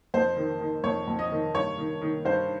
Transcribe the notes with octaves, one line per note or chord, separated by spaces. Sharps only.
F2 C5
D#3
D#3
F2 C#5
F2
D#5
D#3
G2 C#5
D#3
D#3
G2 C5